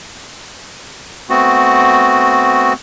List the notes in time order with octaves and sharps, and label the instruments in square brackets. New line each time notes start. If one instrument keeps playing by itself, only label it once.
[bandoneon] A3 B3 C4 F#4